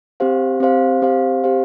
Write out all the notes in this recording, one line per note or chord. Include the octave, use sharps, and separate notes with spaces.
C4 G4 C5 F5
C4 G4 C5 F5
C4 G4 C5 F5
C4 G4 C5 F5